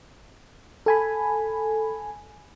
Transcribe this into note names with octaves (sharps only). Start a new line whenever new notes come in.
A4 G#5 B5